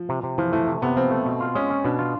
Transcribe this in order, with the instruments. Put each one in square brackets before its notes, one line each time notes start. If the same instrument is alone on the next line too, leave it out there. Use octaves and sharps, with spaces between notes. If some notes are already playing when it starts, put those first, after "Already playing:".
Already playing: [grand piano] F3
[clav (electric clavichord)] C3
C3
[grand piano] E3 [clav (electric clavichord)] F3
[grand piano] E3 [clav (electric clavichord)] A3
[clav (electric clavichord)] C3
[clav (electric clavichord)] C3 [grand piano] B3
[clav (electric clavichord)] F3 [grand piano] C4
[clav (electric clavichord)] A3
B2
F4
[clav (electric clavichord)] G#3 [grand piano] C#4
[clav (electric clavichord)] C#4
[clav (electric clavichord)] B2 [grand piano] D4
[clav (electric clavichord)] F4